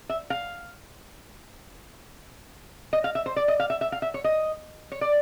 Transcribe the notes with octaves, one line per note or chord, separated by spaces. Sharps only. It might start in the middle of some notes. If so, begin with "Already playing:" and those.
E5
F5
D#5
F5
E5
C5
D5
D#5
F5
E5
E5
F5
E5
C#5
D#5
C#5
D5